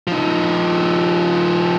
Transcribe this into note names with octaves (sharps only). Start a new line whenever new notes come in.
F3 D#4